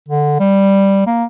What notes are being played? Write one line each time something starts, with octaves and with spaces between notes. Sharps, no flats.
D3
G3
A#3